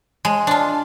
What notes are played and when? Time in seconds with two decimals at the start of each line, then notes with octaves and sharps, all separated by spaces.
0.25 G#3
0.47 D4 F4